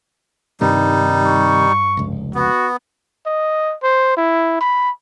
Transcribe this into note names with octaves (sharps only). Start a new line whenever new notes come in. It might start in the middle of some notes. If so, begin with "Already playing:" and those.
G2 C3 D#3 G3 D#4
C#6
F1 C#2
B3 F#4
D#5
C5
E4
B5